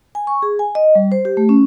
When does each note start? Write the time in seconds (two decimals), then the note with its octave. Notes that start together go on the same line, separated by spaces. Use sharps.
0.15 G#5
0.27 C#6
0.42 G#4
0.59 G#5
0.75 D#5
0.95 G3
1.12 C5
1.25 G4
1.37 A3
1.49 C#4